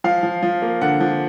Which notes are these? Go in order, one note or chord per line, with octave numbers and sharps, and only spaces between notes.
F3 F5
F3
F3
A#3
D3 F#5
F3